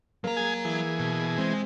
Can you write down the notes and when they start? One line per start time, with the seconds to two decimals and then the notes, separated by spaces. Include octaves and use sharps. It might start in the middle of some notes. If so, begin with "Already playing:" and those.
0.24 F#3 A#3 A#5
0.37 G#4 G#5
0.65 E3 G#4
0.99 B2
1.38 G#3 C4